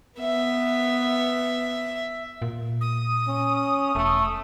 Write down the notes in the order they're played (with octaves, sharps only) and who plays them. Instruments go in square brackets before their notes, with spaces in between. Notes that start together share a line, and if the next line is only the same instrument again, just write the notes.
[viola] B3 [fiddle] E5
[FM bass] A#2
[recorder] D#6
[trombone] C#4
[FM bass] E1 [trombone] A3